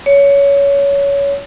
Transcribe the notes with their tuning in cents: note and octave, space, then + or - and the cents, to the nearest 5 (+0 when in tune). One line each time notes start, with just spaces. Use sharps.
C#5 +20